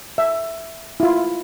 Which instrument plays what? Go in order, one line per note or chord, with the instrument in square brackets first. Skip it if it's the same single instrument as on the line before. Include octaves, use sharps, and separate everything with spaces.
[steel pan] E5
E4 F4